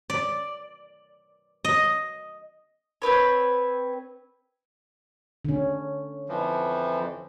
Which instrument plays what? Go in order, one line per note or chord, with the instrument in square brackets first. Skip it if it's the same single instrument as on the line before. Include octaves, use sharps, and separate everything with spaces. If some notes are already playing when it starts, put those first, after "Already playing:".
[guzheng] D5
D#5
[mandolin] C4 E4 B4 C#5
[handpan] D3 C#4
[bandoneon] F2 E3 F3